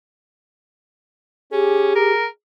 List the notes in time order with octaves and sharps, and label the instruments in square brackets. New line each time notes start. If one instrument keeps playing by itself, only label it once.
[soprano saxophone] C#4 [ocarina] G4 [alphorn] G#4
[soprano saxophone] A#4